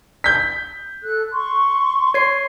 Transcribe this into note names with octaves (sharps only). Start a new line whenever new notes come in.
G6 B6
A4 F#6
C6 C#6
C#5 C7